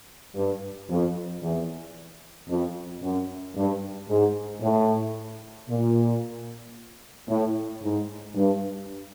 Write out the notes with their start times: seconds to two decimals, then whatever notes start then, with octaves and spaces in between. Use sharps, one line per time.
0.35 G2
0.89 F2
1.42 E2
2.48 F2
3.02 F#2
3.55 G2
4.09 G#2
4.61 A2
5.68 A#2
7.28 A2
7.82 G#2
8.35 G2